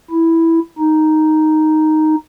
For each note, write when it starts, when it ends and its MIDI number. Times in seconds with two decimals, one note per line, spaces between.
0.11 0.60 64
0.79 2.16 63